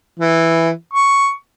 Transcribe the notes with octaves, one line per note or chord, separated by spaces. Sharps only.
E3
C#6